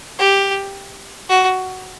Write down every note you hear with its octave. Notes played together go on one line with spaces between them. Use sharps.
G4
F#4